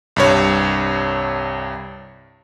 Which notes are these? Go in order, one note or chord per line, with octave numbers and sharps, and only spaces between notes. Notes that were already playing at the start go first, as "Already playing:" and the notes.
C2 G2 C#5